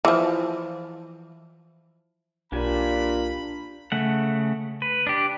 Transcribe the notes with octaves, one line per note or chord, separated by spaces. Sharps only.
E3 F3
B1 A#2 D4 G4 G#5 B5
C#3 A3 F#5
B4
D4 G4